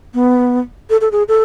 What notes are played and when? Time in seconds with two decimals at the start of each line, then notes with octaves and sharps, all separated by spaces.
0.14 B3
0.90 A4
1.01 A4
1.12 G#4
1.28 A4